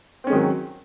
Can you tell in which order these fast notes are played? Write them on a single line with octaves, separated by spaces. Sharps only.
C4 C#4 G#3 D#3 F#3